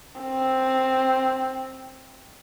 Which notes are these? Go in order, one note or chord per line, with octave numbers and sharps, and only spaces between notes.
C4